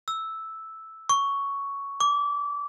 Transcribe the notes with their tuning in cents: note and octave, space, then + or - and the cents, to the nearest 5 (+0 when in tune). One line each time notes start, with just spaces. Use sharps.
E6 -5
C#6 +5
D6 -25